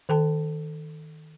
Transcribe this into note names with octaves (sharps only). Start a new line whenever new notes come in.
D#3 A4 G5 A5